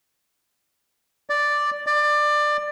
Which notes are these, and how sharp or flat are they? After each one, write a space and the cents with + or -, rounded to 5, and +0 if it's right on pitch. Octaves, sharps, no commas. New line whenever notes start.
D5 +0
D5 +20